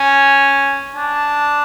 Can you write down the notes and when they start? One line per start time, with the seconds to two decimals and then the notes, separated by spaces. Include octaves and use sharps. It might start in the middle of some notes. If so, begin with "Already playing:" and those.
Already playing: C#4 G#5
0.96 D4 A5